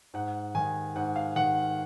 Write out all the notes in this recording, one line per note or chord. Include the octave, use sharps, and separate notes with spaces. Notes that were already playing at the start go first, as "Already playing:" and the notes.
G#2 F#5
D#3 G#5
G#2 F#5
F5
D#3 F#5